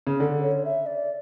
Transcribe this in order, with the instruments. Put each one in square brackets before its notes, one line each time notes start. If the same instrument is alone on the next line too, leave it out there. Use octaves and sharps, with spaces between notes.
[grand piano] C#3
[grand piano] D3 [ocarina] A4
[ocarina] C#5
E5
D5